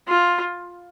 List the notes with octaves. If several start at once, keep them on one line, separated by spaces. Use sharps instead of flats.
F4